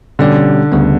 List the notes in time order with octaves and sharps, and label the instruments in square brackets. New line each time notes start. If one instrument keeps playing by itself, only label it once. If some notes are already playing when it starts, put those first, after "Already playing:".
[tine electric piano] B2 G3 C#4 G4 D5 [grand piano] D3
[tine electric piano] D2 C#3 G3 B3